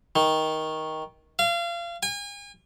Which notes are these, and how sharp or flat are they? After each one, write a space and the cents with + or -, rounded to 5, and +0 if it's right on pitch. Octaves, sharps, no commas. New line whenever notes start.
D#3 +15
F5 -30
G#5 -40